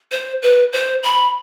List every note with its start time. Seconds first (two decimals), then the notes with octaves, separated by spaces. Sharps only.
0.11 C5
0.42 B4
0.73 C5
1.03 B5